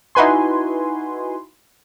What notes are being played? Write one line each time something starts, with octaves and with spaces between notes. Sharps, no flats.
D#4 E4 F#4 B4 G#5 C6